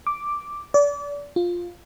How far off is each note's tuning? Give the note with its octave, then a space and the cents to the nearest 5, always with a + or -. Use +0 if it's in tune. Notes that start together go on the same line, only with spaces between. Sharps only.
D6 +0
D5 -30
F4 +5